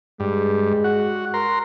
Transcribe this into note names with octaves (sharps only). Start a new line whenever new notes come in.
G2 G#3
F#4
A#4 C6